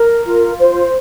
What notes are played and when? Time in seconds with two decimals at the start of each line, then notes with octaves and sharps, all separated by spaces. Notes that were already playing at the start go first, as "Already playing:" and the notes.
Already playing: A#4
0.24 F4
0.59 C5